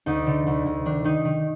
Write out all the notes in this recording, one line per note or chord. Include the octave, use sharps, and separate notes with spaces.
D2 D#4
D3
D2
D2
D#3 D4
D#3 D#4
D#3